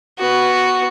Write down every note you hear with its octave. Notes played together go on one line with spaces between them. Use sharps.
B3 F#4